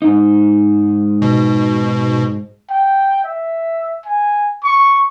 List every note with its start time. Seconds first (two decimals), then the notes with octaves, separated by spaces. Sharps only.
0.02 G#2 D#4
1.22 B2
2.70 G5
3.24 E5
4.06 G#5
4.64 C#6